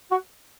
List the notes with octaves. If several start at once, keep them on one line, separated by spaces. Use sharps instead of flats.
F#4